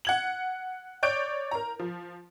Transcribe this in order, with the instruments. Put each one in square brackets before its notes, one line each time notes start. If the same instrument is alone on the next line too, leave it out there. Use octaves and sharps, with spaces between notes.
[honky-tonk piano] F#5 G#6 F#7
C#5 D5 G6 D7
A#4 A#5
F3